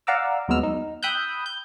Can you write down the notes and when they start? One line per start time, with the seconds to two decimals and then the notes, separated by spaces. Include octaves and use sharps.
0.07 D5 F5 F#5 A#5 D6 E6
0.48 D#2 F#3 G#3 B3 E6 F6
0.63 D#4
1.03 G5 B5 D#6 E6 F#6 G6
1.46 G6